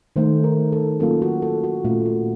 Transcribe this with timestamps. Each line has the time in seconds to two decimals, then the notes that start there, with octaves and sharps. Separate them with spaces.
0.16 D#3 A3 D#4 C5
0.44 A#4
0.72 A4
1.00 F#3 A#3 C#4 F4 A4
1.22 F#4
1.42 A4
1.64 F#4
1.84 A#2 A3 C#4 F4
2.06 F#4